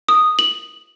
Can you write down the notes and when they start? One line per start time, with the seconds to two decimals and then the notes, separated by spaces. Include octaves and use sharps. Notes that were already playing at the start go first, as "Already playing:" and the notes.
0.09 D#6
0.39 F#7